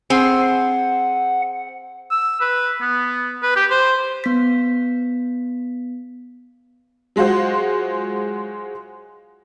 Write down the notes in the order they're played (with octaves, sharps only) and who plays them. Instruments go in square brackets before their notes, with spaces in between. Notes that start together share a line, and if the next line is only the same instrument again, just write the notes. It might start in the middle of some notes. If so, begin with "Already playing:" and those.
[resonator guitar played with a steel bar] C4 G#4 [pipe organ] F#5
[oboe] E6
B4
B3
B4
G4
C5
[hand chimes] B3 B6
[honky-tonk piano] F#3 G#3 F4 F#4 C5